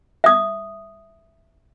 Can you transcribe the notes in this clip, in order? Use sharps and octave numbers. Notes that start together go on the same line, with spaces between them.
E5 D#6